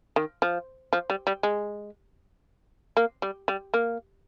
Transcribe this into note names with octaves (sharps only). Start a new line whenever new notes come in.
D#3
F3
F3
G3
G3
G#3
A#3
G3
G3
A#3